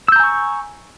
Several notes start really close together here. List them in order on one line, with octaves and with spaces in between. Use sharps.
E6 G6 A#5 G#5 C#6